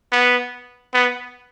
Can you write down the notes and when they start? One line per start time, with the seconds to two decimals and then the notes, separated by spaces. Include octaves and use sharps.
0.12 B3
0.94 B3